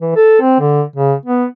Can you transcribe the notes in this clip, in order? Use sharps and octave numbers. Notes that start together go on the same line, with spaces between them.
E3
A4
C4
D3
C#3
B3